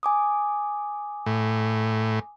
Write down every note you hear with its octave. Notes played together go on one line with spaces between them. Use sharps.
G#5 D6 D#6
A2